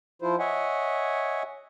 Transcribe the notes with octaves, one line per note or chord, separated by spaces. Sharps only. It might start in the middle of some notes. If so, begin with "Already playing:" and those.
F3 E4 F4 C5
C#5 D#5 E5 F#5 G#5